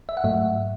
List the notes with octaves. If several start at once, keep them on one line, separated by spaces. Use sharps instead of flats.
E5
F#5
G#2 F#3 A3 E5